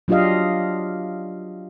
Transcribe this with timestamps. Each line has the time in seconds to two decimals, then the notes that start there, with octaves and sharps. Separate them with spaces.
0.08 F#3 D4 F4 G4 D#5 F5